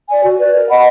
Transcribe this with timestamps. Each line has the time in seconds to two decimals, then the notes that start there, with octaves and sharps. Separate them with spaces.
0.08 D5 G#5
0.23 F#4
0.38 B4 D5
0.54 A#4
0.69 D#5 F#5 B5